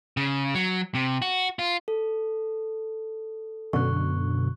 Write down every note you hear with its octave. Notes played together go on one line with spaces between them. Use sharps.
C#3
F#3
C3
F#4
F4
A4
F#2 B2 D3 C#6 F#6